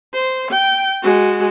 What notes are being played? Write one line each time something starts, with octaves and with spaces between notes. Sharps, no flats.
C5
G5
G#3 F#4